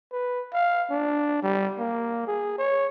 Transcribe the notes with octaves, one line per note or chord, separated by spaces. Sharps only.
B4
F5
D4
G3
A#3
G#4
C#5